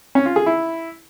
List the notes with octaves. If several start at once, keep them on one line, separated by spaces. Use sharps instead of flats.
C#4
F4
G#4
E4